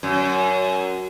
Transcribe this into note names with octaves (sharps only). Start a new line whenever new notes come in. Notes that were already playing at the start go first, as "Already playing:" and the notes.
F#2